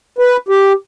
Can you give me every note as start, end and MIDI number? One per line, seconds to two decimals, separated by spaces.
0.18 0.37 71
0.49 0.73 67